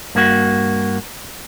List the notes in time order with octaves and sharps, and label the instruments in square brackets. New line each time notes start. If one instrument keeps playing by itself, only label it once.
[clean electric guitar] G2 A#3 F#4